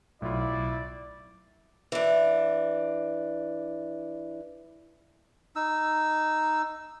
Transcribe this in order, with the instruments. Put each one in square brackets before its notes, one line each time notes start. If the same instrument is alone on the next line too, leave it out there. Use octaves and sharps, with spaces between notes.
[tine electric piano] B1 [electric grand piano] A2 F4 [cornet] E4 [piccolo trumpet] D5
[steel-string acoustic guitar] E3 D4
[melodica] D#4 E6